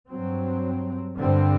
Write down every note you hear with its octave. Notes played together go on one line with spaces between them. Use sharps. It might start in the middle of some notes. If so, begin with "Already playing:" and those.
G2 F#3 C4
G2 D3 G3 C4